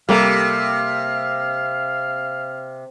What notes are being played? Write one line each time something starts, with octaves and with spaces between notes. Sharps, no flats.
C3 G3 A#3 A4 F5